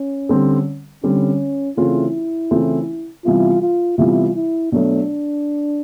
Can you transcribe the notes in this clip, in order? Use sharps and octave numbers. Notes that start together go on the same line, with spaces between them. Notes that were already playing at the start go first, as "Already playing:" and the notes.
Already playing: C#4
D3 G3 C4
D3 G3 C4 C#4
C#3 E3 A3 C4 E4 F4
C#3 E3 A3 C4 F4
C3 E3 G3 B3 E4 F4
F4
C3 E3 G3 B3 E4 F4
E4
B2 F#3 A3 D4